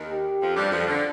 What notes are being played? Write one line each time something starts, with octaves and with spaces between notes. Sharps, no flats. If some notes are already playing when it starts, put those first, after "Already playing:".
Already playing: D#2 D#3
G4
F2 F3
G2 G3
F2 F3
D3